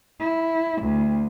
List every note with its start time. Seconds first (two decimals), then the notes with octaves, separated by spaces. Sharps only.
0.20 E4
0.82 D2